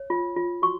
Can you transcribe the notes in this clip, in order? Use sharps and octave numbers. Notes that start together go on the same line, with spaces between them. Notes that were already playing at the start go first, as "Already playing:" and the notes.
Already playing: C#5
F4
F4
F#4 C#6